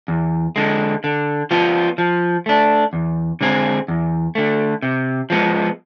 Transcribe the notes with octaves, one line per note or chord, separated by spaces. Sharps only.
E2
D3 G#3
D3
F3 B3 F4
F3
A3 D4
E2
D3 G#3 C4 G#4
E2
D3 A3
C3
F3 G#3 B3